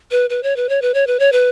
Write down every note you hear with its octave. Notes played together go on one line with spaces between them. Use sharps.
B4
B4
C#5
B4
C#5
B4
C#5
B4
C#5
B4